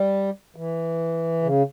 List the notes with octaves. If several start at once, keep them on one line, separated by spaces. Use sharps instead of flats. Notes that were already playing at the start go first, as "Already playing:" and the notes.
Already playing: G3
E3
C#3